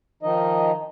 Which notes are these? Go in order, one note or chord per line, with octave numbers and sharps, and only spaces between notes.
D#3 F3 D#4 D#5